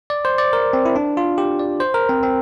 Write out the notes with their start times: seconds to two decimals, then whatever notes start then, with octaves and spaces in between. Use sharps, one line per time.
0.10 D5
0.25 C5
0.38 D5
0.53 A#4
0.73 C4
0.86 E4
0.96 D4
1.17 F4
1.38 G4
1.59 D5
1.80 C5
1.94 A#4
2.09 C4
2.23 C4